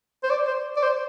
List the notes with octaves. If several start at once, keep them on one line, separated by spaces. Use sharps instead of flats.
C5
D5
C5
D5
C5